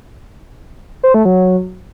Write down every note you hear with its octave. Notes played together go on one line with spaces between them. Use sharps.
C5
A3
F#3